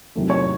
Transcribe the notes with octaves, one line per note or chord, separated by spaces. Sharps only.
E2 C3 D#3 F#3 A3
C#5